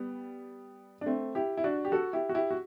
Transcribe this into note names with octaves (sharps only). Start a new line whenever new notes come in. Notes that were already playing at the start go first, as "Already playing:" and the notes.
Already playing: G3 B3
D4
A3 C4
E4 G4
E4
D4 F#4
G4
F#4 A4
E4 G4
F#4
E4 G4
F#4